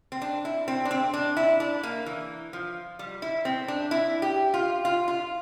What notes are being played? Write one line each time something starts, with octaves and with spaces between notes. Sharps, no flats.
C4
D4
E4
C4
D4
C4
D4
E4
D4
A#3
E3
F3
G3
E4
C4
D4
E4
G4
F4
F4
F4